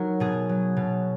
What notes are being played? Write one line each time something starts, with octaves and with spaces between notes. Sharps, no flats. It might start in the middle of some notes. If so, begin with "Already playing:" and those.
Already playing: F#3 D#4 F#4 A#4
B2 G#4
F#3
B2